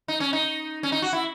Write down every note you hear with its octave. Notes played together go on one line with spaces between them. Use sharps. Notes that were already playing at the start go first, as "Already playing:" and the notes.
D#4
C#4
D#4
C#4
D#4
F#4
E4